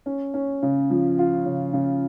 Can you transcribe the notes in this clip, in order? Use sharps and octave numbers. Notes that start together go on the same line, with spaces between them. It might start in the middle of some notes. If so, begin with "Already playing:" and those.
C#4
C#4
C#3
F3
F4
C#3
C#3